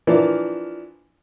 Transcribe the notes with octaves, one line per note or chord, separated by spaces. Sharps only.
E3 F3 A#3 D4